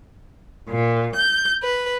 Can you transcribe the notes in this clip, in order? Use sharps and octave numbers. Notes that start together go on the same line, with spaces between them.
A#2
G6
B4